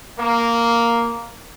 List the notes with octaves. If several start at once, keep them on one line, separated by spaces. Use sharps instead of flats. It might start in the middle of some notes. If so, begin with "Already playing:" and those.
A#3